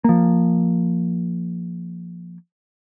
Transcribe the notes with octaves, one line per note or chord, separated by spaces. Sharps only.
F3 A#3